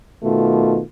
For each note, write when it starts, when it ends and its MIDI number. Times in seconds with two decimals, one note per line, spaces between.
0.24 0.81 47
0.24 0.81 51
0.24 0.81 57
0.24 0.81 65